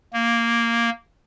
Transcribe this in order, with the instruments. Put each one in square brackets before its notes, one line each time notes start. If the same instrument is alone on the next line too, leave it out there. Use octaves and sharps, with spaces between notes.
[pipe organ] A#3